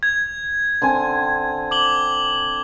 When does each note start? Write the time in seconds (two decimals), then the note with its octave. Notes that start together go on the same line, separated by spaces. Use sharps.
0.03 G#6
0.82 D3 C4 G#5
1.71 D6 F#7 G7